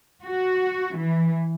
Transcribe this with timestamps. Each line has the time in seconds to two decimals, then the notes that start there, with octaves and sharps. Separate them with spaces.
0.23 F#4
0.95 E3